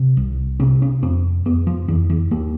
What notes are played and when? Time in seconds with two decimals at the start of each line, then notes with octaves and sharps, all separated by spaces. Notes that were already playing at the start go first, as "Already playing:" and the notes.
Already playing: C3
0.17 C2
0.60 C3 C#4
0.82 C#4
1.03 F2 C4
1.45 F2 B3
1.67 F3
1.88 F2 E3
2.10 E3
2.31 D#2 A#3